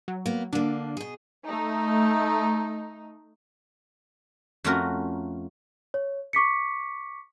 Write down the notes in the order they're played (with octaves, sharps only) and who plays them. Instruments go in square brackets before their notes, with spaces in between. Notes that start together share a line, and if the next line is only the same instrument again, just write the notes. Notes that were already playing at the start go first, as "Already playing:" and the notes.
[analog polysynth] F#3
[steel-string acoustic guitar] A#3 B3
[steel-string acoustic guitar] D3 A#3 [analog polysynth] D4
[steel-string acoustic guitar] B2 G#4
[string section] A3 D#4
[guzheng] F2 A3 C#4 F4 F#4 A#4
[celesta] C#5
C#6 D6 B6 C#7